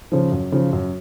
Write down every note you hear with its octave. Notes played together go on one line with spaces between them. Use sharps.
C#3 F3
F#2
C#3 F3
F#2